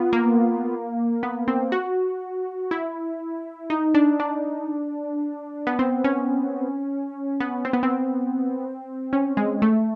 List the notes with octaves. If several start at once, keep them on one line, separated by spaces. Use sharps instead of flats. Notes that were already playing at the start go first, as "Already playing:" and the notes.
Already playing: B3 F4
A#3
B3
C4
F#4
E4
D#4
D4
D4
B3
C4
C#4
B3
C4
B3
C4
C#4
G#3
A3